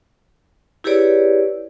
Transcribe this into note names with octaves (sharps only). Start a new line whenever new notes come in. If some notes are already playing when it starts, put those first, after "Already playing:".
E4 G4 G#4 B4 C#5 D5